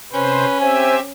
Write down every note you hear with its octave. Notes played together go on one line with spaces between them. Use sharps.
C3 C#4 B4 C5
C4 G4 C5 E5 G#5